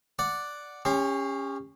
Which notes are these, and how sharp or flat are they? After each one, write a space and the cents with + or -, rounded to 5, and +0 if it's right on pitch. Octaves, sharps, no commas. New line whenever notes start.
D5 +0 F#5 +0
C#4 +0 G4 +40 C6 +0